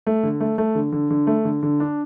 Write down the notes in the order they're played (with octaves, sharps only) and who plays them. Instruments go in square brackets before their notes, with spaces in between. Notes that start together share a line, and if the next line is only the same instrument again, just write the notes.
[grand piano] A3
D3
A3
A3
D3
D3
D3
A3
D3
D3
D4